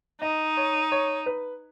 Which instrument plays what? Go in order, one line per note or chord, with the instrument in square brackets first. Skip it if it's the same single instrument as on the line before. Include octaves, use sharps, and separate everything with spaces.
[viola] D#4 [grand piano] D#5
[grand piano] C#5
C#5
B4